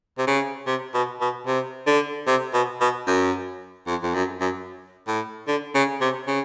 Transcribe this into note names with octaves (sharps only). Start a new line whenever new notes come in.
C3
C#3
C3
B2
B2
C3
D3
C3
B2
B2
F#2
F2
F2
F#2
F#2
A2
D3
C#3
C3
C#3